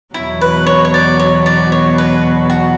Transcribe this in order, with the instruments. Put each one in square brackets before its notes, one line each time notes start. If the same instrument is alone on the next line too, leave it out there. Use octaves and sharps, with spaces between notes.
[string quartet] E2 B2 F#3 [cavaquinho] E4
[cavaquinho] B4
C#5
C#5
D5
C#5
D5
C#5
B4
F#4